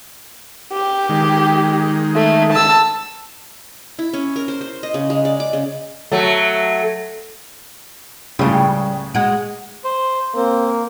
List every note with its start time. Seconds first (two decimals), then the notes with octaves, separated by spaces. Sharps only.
0.72 G4
1.09 D#3 G#3
2.16 A3
2.52 A5 E6
3.99 E4
4.14 C#4
4.36 A#4
4.48 C5
4.61 C5
4.83 D#5
4.94 C#3
5.10 G#3
5.25 D5
5.40 D6
5.53 C#3
6.12 F#3 A3
8.39 C#2 A2 C#3 G3 G4
9.15 G#3 F#4
9.84 C5
10.35 A#3 C4